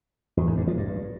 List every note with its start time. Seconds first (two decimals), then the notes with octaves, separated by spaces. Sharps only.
0.37 E2
0.47 G#2
0.57 G2
0.67 F3
0.77 G2